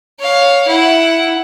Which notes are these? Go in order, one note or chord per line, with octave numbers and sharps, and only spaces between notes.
C#5 F5
E4 F#5